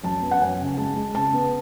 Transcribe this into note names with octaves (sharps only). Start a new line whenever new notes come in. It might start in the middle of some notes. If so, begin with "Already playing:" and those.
F#2 A5
B3
F#5
F#2 G#5
C#3
G#3 A5
G#3
C#3 A5
B3